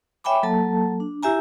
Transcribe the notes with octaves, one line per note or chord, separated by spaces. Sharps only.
C#5 E5 G5 G#5 B5 D6
F#3 A#3 A4 A5
D4
E4 G4 E5 G#5 A#5